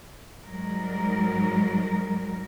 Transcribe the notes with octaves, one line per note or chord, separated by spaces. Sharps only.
G#2 F#3 G3 A#4